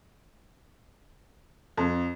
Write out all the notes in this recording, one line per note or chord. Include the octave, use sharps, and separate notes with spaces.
F2